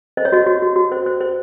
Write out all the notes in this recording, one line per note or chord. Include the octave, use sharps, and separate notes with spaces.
C5 D#5
C#5
F#4 D#5
F#4
F#4
F#4
C5
C5
C5